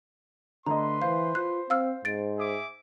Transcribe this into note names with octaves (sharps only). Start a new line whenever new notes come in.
D3 A3 B4 D#5 A#5 C6
E3 C5 F5
F4 C5 F#6
C4 F5 E6 F6
G#2 A6 D7
G#4 E5 D6